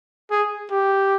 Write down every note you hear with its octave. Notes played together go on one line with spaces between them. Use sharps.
G#4
G4